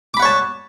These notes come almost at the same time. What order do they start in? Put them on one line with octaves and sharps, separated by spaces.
D6 B5 F#5 C#5 A5